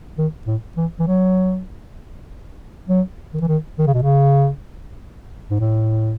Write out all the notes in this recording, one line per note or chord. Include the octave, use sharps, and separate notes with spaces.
D#3
A2
E3
E3
F#3
F#3
D#3
E3
D#3
D#3
C#3
B2
C#3
G#2
A2